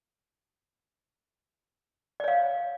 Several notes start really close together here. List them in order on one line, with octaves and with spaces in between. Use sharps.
D5 C#5 F5